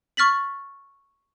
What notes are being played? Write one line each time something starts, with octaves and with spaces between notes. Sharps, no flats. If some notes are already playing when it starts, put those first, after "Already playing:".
C#6 F6 A6 B6 F#7